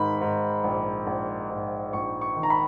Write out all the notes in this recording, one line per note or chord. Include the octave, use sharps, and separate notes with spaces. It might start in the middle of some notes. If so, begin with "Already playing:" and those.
Already playing: G#2 D#3 B5
G#2
A#1
A#1
G#2
A#1 C#6
C#6
D#3
A#5
B5